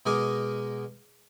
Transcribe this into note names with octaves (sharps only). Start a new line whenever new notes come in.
B2 G#3 G#4 A#4 D6 D#6